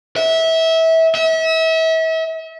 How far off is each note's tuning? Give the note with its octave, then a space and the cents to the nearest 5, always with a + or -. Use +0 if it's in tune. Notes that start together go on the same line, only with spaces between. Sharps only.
E5 -25
E5 -35